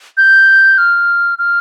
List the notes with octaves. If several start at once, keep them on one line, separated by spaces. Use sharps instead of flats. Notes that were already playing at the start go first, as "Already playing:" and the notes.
G6
F6
F6